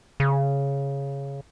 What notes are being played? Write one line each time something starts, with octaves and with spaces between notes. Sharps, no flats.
C#3